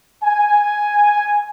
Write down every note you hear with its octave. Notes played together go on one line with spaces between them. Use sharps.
G#5